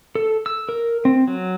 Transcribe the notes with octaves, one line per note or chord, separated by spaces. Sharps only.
A4
E6
A#4
C4
F#3